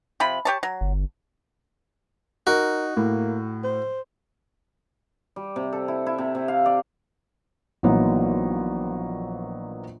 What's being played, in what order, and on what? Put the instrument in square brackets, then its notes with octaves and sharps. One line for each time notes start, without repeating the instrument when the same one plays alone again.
[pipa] C3 F3 B5
G4 C#5 A5
F#3
[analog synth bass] G1
[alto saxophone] D#4 [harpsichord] F#4 [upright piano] A#4
[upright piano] A2 [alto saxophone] A#3
[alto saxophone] C5
[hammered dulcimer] G3
C3
A4
E4
E4
C3
C3
F5
D5
[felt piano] A#1 E3 F#3 A#3 B3 D#4